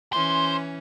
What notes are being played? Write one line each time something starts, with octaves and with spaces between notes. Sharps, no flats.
E3 C#4 C5 C6